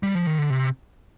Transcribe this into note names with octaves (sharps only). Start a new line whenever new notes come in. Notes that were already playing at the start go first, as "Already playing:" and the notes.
G3
F3
D#3
D3
C3